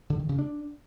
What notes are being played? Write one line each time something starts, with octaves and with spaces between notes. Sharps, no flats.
D3
D#3
C#3
D4